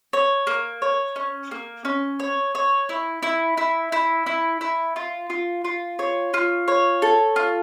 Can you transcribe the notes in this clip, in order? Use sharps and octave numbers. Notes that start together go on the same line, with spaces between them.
C#5
A#3
C#5
C#4
A#3
C#4
C#5
C#5
E4
E4
E4
E4
E4
E4
F4
F4
F4
C#5
F4
C#5
A4
F4